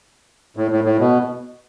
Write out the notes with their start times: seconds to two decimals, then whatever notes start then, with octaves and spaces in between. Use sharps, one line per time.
0.57 A2
0.71 A2
0.84 A2
0.99 B2